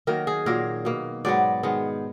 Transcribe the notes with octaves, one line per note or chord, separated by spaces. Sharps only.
D#3 F#3 A#3 A#4
G#4
A#2 F#3 A#3 A#4
B2 A#3
G#2 F#3 B3 D5
D#3 G#3 B3